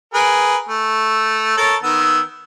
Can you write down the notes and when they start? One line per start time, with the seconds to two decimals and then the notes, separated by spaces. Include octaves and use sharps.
0.14 G#4 A#4 B4
0.69 A3
1.57 A4 A#4 C#5
1.83 D#3 B3 E6